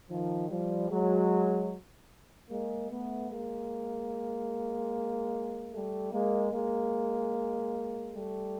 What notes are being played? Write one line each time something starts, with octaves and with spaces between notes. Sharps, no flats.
D#3 F3
F3 G3
F#3 G#3
G#3 A#3
A3 B3
G#3 A#3
G3 A3
G#3 A#3
G#3 A#3
G3 A3